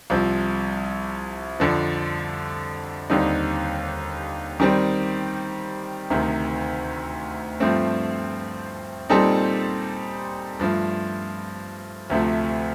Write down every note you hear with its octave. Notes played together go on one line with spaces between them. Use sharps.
C2 C3 F3
F2 D3 F3
D#2 D3 G3 C4 D#4
D#3 G3 C4
D2 C3 D#3
G2 F3 A3 C4
A#2 G3 C4 D#4 A4
G2 F3 A3
D2 C3 F3 A3